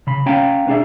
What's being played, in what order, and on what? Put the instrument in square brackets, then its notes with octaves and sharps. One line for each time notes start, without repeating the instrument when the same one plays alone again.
[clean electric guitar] C#3 B5
C#4 C#5 F5 G5 G#5 A#5
B3 C#4 D4 G#4 D5 E5